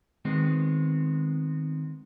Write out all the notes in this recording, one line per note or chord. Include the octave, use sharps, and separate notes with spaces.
D#3 G#3 B3 C4